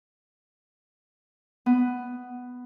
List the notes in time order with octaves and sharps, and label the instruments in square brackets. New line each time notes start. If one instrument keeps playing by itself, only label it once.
[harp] B3